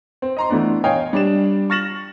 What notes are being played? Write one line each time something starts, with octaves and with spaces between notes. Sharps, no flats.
C4
D#5 A#5 C6
E3 A3 B3 D4
C#5 D#5 F5 G5 G#5 D#6
G3 D4 E7
C#6 F6 A6 A#6 E7 F#7